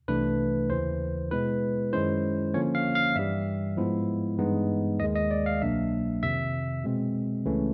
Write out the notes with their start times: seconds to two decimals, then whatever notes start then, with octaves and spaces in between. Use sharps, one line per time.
0.08 C2 C3 E3 A3 D4 B4
0.70 D#2 C#3 E3 C5
1.31 B2 G#3 B3 E4 B4
1.93 F#2 D#3 G#3 C#4 E4 C5
2.54 D3 F3 A#3 C#4 C#5
2.75 F5
2.95 F5
3.16 G2 E3 G3 E5
3.77 G#2 F3 G#3 B3 E4
4.39 G2 E3 G#3 B3 D#4
5.00 D#2 D#3 G#3 D#5
5.15 D#5
5.31 D5
5.46 F5
5.61 C2 B2 F#3 A#3 D4 E5
6.23 F2 C3 D#3 E5
6.84 B2 G#3 C4
7.45 C#2 C#3 E3 A3 C#4